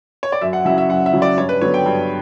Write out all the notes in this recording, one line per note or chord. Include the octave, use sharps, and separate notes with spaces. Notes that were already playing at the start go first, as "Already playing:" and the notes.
C#5
D5
F#2 E5
F#5
C#3 F#3 C#4 E4 E5
E5
F#2 F#5
E5
C#3 F#3 C#4 E4
D5
G2 C#5
B4
D3 F#3 B3 C#5
G5
G2